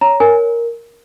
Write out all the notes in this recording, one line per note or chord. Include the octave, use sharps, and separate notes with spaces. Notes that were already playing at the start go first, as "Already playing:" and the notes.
C#5 A#5
A#4 G#5